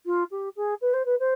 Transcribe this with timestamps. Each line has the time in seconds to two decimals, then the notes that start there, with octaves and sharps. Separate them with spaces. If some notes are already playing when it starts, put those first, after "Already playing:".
0.06 F4
0.31 G4
0.57 G#4
0.81 B4
0.94 C5
1.06 B4
1.20 C5